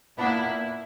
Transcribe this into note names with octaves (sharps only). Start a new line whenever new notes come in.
A#2 A#3 B3 D4 E4